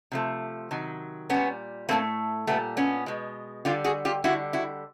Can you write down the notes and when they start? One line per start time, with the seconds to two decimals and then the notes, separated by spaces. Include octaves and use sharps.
0.12 C3 F3 A3
0.71 C3 D#3 F#3
1.30 A#2 G3 B3 C#4
1.89 A2 F#3 A3 A#3 C4
2.47 A#2 G3 A3 B3
2.77 B3 C#4
3.06 B2 G#3
3.65 D3 G3 F4 G4
3.84 F#4 G#4
4.05 F4 G4
4.24 D3 G3 E4 F#4
4.53 E4 F#4